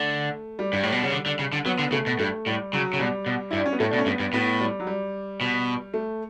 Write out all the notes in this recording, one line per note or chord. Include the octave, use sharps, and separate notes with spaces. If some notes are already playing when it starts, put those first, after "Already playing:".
Already playing: D3 A3
G3
G2
A2
B2
C#3
D3
D3
C#3
D3
F#3 B3
D3
C#3 A3
B2
G2 A3
A2 G3
C#3 F#3
C#3
B2 G3
B2
G2 E4
D4
C#4
B3
A2 A3
B2 D4
C#4
G2 B3
G2
A2 B3
G3
F#3
G3
B2
A3